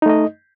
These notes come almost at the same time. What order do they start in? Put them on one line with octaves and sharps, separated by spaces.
D#4 A3 D#5